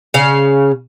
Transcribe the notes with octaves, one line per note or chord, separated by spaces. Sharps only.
C#3 F5